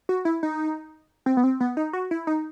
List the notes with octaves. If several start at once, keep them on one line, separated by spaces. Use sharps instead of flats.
F#4
E4
D#4
C4
B3
C4
B3
D#4
F#4
E4
D#4